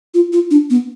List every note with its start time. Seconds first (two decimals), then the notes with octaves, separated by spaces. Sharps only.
0.14 F4
0.33 F4
0.51 D4
0.70 B3